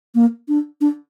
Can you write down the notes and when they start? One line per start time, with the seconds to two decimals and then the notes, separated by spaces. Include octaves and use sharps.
0.15 A#3
0.48 D4
0.81 D4